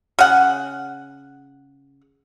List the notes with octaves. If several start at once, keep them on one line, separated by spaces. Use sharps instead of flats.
C#3 F#5